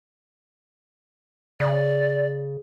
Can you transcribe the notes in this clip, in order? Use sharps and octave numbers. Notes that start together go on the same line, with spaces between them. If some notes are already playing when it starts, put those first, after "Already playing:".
C#3 D5